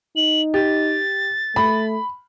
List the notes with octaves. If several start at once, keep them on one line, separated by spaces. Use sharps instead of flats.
D#4 F#7
G4 A6
A3 B5